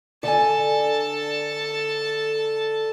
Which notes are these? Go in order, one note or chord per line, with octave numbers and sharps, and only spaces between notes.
D3 A4 G#5 A5